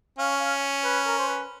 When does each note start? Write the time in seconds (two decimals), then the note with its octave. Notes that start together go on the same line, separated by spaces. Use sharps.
0.19 C#4 F5
0.40 F5
0.84 B4
1.06 A#4
1.18 C5
1.28 B4